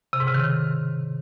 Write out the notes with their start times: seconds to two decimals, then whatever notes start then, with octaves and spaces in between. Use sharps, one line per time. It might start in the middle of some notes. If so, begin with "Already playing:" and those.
0.13 C3
0.20 G#2
0.27 C#3
0.34 D#3